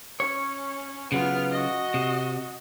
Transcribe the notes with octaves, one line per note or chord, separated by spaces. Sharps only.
C#4 C#5
C#3 F#3 B3 F4 F6
F#4 D#5
C3